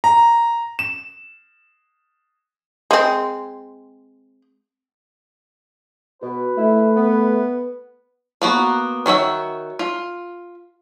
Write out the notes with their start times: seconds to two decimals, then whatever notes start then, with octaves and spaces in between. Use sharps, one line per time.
0.04 A#5
0.79 E7
2.91 G#3 C4
6.22 B2 F#4 B4
6.57 A3 E4
6.96 B3
8.42 A#3 B3 F#4
9.06 D#3 F#4 C#5 E5
9.79 F4